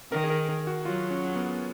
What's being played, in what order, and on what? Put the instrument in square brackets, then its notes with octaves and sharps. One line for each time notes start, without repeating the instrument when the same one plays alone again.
[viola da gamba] D#3 [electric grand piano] A#4
[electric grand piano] G#4
A#4
A#4
F#4
[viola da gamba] F#3 [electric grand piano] F4
[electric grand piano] C#4
B3